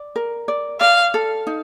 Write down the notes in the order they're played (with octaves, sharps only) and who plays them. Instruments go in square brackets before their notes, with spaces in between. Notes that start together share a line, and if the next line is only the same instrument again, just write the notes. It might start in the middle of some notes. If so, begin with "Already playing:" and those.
Already playing: [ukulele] D5
A#4
D5
[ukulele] D5 [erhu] F5
[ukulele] A4
D#4